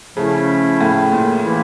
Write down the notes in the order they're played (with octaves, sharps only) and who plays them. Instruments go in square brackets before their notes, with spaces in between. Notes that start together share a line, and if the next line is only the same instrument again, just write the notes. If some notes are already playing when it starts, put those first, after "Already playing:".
[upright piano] C#3 [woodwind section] F3 A3 C#4 E4 A4
[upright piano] A2
A#2
[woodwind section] E3 A#3 E4